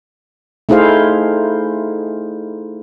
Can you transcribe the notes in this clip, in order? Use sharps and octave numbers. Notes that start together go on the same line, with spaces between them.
A3 D#4 E4 G#4 C5 F5